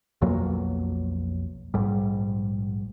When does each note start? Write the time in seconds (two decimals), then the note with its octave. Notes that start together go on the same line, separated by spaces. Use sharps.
0.21 B1 F2 F#3 A#3
1.74 A#1 G#2 G3